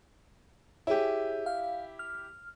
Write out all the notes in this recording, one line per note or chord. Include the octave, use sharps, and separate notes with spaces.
E4 G4 G#4 C#5
F5
F6